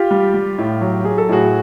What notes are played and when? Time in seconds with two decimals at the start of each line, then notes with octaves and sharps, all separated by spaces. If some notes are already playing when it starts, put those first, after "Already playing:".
Already playing: F4 G4
0.11 G3
0.34 G3
0.58 A2
0.81 F#3
1.04 F#3 G#4
1.18 A4
1.29 A2 F#4 G#4